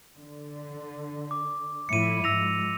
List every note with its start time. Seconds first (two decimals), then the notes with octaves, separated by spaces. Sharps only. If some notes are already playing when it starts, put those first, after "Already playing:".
0.17 D3
1.31 D6
1.89 A2 F3 E4 C#7 D#7
2.24 G#2 F3 E6 A#6 F7